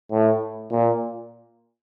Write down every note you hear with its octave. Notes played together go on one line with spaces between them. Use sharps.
A2
A#2